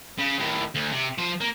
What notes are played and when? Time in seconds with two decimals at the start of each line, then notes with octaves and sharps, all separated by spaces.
0.19 C#3
0.39 D#2 A2
0.75 D2
0.91 C3
1.18 F3 C5
1.41 A#3